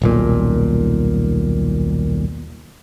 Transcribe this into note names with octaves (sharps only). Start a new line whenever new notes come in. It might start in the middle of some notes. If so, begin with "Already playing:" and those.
D#1 B1 A#2